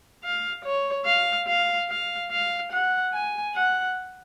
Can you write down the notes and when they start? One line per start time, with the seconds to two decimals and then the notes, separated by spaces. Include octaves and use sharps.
0.24 F5
0.64 C#5
1.06 F5
1.48 F5
1.90 F5
2.31 F5
2.72 F#5
3.14 G#5
3.55 F#5